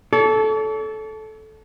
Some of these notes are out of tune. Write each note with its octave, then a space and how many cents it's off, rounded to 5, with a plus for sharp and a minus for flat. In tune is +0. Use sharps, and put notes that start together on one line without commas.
A4 -15 C#5 +45